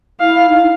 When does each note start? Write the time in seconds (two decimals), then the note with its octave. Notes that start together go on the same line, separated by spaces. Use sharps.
0.20 E4 F5
0.49 D#4